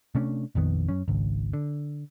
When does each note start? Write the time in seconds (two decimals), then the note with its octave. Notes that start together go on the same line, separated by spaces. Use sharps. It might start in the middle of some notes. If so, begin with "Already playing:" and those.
0.15 C3 A3 C#4 D4
0.55 A#1 F2 D#3 B3
0.89 F#2 C#4
1.08 G#1 C#2
1.53 D3